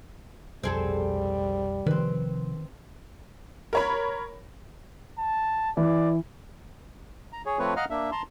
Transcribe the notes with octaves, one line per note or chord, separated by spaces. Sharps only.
F1 B1 F2 G3 C4 G#4 A4
C3 D#3 F3 C4 B4
A#4 C#5 B5
A5
E3 D5
A#5
G#4 C#5
F3 A3 C4 B4 C#5
D#5 F5 F#5 A#5 F6
A#3 D4 E5
A5 A#5 C6